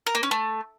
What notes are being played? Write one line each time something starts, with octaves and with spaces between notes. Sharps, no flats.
A#4
A#3
C#4
A3